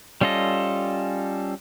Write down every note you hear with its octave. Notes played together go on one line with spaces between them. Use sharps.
G3 C#4 F4 A4 D#5